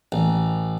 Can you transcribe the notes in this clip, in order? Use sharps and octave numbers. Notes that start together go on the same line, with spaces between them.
A1